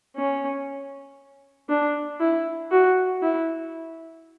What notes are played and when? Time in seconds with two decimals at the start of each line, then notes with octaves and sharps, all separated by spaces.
0.16 C#4
1.69 D4
2.20 E4
2.71 F#4
3.22 E4